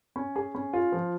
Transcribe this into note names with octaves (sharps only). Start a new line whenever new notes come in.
C#4
G#4
C#4
F4
F3